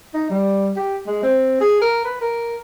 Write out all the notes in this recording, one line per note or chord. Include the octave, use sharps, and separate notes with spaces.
D#4
G3
G4
G#3
C4
G#4
A#4
B4
A#4